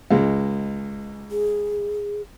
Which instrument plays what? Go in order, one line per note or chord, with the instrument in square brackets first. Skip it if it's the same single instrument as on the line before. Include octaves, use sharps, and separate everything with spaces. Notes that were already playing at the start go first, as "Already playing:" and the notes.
[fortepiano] C#2 G#3
[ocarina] G#4